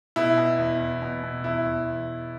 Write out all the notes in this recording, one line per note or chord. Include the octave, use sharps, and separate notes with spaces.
B2 E4
B2
E2
E2
B2
B2
E2 E4
E2